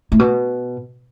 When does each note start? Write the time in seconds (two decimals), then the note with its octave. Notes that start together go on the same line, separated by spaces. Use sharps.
0.12 A2
0.19 B2